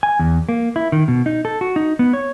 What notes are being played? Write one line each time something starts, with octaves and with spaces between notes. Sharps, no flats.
G#5
E2
A#3
E4
D#3
B2
D#4
A4
F#4
D#4
B3
C#5